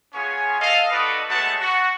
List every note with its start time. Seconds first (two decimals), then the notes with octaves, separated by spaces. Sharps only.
0.14 B3 C#4 F4 G#4 C#5 G#5
0.61 A4 D#5 F5
0.92 D#4 F#4 A4 B4 D5 D#5
1.29 G#3 A3 B3 F#4 C#5 A5
1.61 F#4